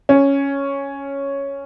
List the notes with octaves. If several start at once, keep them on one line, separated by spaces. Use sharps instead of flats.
C#4